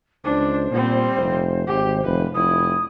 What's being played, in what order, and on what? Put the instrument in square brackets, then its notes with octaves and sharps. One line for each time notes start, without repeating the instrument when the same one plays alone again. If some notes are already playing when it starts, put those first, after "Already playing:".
[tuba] C#2 [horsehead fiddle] D4 [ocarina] C5
[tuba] A#2 [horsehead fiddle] G3 C4
[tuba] F1
[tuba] G#1 [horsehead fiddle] G4
[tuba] F1 [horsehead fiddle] B4
[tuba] F1 [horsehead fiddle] E4 [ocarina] D#6